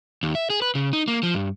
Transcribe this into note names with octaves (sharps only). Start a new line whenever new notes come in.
D#2
E5
G#4
B4
C#3
D#4
A#3
F3
G2